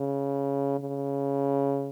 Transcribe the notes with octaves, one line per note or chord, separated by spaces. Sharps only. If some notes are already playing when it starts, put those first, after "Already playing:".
Already playing: C#3
C#3